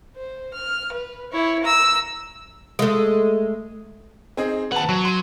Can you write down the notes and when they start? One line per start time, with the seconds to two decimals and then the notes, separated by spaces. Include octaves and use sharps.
0.17 C5
0.54 F6
0.92 B4
1.32 E4 C#5
1.63 A#5 E6
2.79 G#3 A3
4.37 C4 D#4 G#4
4.72 D#2 B4 F#5 A5
4.89 F#3
5.05 C6 D#7